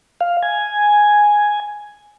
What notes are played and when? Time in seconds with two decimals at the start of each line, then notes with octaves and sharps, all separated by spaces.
0.20 F5
0.43 G#5